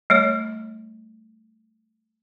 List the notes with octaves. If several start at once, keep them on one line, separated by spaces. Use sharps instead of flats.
G3 A3 C#5